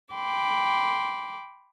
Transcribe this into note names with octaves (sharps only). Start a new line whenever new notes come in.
G5 B5 C6 D6